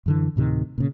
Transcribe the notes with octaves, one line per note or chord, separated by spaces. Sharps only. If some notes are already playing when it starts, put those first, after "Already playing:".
F#2 D3 E3
D2 A2 C3 D#3
A#2 C#3